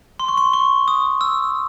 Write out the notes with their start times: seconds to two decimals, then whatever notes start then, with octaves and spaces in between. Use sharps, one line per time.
0.20 C6
0.28 C#6
0.38 C6
0.53 C#6
0.88 D#6
1.21 E6